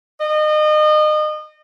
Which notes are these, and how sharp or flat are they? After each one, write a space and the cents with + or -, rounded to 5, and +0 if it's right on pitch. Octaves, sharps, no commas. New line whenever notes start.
D#5 -30